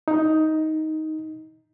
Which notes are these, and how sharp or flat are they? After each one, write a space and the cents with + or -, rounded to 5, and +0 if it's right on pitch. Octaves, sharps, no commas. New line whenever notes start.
D#4 +10